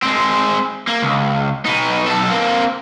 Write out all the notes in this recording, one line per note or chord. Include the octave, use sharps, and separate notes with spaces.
G#3 C4
A#3
C#2
B2 D#4
B1 A4
A#3 C4